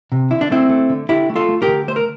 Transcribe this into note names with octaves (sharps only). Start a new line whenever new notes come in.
C3
D3 E4
D4
A3 C4 E4
A3
D3
D3 E4 G4
A3
F4 A4
A3
G4 A#4
D3
A3 C5
A#4